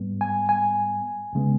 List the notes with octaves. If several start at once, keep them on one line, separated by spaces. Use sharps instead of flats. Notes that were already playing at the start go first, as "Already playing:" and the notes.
Already playing: G#2 G3 B3
G#5
G#5
C#2 C#3 G#3 B3